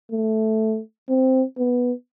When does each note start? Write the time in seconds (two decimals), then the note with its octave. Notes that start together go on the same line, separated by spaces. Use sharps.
0.12 A3
1.09 C4
1.58 B3